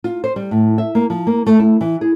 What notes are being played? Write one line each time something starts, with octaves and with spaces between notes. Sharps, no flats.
F4
C5
G3
A2
E5
A#3
F3
A#3
A3
E4
E3
G#4